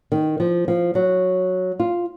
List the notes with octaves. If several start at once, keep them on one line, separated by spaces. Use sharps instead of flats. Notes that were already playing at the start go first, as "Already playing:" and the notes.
D#3
F3
F3
F#3
F4